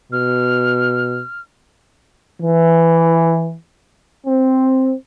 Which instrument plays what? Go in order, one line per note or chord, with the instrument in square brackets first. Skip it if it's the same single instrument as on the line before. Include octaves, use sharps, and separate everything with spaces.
[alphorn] B2 [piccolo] F6
[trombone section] E3
C4